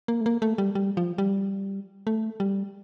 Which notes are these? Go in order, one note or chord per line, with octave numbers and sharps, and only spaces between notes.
A#3
A3
A#3
A3
G3
G3
F3
G3
A3
G3